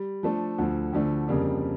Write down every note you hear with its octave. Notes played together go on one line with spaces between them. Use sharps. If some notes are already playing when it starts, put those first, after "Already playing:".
Already playing: G3
F3 A3 D4 A4
D2 D3 F3
D2 D3 F3 A3 D4
F2 C#3 G3 A#3 D4